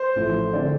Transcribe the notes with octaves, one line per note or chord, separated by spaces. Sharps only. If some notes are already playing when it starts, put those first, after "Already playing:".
Already playing: C5
A1 A2 F3
D3 A3 C4 D5